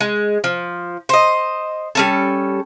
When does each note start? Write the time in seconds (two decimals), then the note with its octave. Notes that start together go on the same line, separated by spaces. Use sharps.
0.01 G#3
0.44 F3
1.09 C5 D#5
1.95 G3 C#4 A4